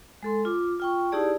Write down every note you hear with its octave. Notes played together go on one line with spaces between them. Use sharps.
G#3 A4 C6
F4 D6
F4 G5 C#6
D#4 E4 G4 G#4 D5 A5